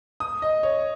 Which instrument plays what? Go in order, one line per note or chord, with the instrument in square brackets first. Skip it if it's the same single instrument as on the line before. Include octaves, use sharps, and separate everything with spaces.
[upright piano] D#6
D#5
C#5